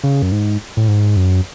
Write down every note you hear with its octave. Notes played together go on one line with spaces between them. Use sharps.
C#3
F#2
G#2
A2
G#2
F#2